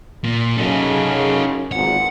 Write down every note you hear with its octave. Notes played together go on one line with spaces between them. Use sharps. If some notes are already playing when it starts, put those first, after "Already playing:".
A#2 A#3
F#2 C#3 D#4 A4
G#1 E2 A#2 F#5